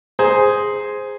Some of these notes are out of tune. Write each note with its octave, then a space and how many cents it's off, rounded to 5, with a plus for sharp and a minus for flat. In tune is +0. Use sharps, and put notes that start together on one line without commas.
G#4 +0 C5 -5 A#5 +0